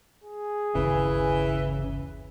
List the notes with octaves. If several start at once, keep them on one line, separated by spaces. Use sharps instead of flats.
G#4
G1 D#2 C#3 E3 C#4